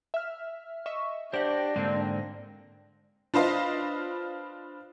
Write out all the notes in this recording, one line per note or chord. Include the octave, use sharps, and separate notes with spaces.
E5 F6
D#5 E5 C#6
D4 G4 C5 D5 F#5 A#6
G#2 D3 A#3 C4
D4 F4 B4 C5 D#5 F5